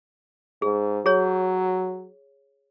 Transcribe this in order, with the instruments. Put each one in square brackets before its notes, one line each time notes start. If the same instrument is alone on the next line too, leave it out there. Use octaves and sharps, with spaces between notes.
[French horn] G#2 [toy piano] G#4
[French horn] F#3 [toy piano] G#4 C#5